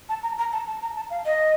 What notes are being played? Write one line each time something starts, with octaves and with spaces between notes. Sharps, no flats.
A5
A#5
A#5
A5
A5
A#5
A5
F5
D#5